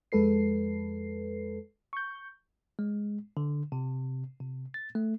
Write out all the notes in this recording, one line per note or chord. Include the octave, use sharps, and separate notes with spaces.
F2 G#3 A4 B4 C7
C#6 G6
G#3
D3
C3
C3
A6
A3